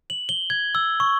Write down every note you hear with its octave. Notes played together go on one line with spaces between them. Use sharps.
F#7
G7
G#6
E6
C#6